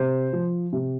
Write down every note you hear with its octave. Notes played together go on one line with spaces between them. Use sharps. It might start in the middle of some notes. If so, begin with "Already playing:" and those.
Already playing: C3 C5
F3
C3